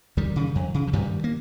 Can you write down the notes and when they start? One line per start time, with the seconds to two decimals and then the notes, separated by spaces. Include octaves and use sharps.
0.17 F2 D#3 G3
0.36 C#3
0.55 F2
0.74 C#3
0.88 F3
0.93 G2 D#3 G3
1.24 A#3